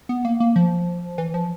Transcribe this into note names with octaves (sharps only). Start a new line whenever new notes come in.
B3
A#3
A#3
F3
E3
F3